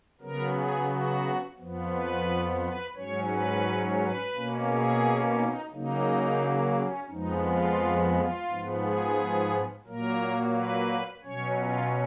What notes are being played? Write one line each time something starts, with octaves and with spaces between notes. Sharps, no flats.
C#3 F#3 B3 A#4
G#4
F#4
F2 F3 B3
B4
B4
G#2 F#3 C#4 C#5
B4
B4
B2 A#3 C#4
G#4
D#4
C#3 F#3 A#3 D#4
C#4
F2 F3 G#3 B3 D#4
F4
F4
G#2 F3 B3
G#4
A#2 F#3 A#3 A#4
B4
B2 F#3 C#4 C#5
F4